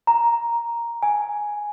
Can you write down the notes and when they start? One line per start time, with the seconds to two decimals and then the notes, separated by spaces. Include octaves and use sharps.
0.07 A#5
1.03 G#5